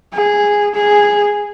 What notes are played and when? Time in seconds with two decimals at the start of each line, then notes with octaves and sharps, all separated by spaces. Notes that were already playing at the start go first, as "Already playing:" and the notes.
0.13 G#4
0.75 G#4